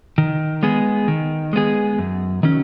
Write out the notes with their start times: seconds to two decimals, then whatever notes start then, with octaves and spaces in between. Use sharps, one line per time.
0.18 D#3
0.63 G#3 B3 G#4
1.08 D#3
1.53 G#3 B3 G#4
1.99 F#2
2.43 D#3 F#3 C#4